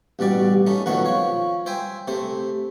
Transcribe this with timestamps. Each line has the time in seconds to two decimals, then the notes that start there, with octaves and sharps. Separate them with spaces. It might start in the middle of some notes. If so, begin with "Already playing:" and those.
0.19 A1 B2 G3 D5
0.67 A3 C#4 D#4
0.86 F2 B2 D#3 F#3 A3 C#6
1.05 F3 C#5
1.66 C5 E5 G5 G#5
2.08 C3 A3 C5